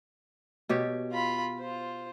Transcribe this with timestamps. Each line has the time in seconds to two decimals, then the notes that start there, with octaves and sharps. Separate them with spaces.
0.69 B2 G4 C#5
1.12 F4 B5
1.59 F4 C5